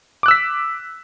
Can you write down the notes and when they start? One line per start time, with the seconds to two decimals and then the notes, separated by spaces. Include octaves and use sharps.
0.23 D6
0.26 F#6
0.28 E6
0.31 B6